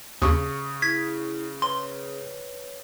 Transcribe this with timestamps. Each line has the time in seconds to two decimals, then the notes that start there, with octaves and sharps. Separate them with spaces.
0.22 D#2 C#3 C#6 D#6
0.82 E4 G#6 B6
1.62 B4 C#5 C6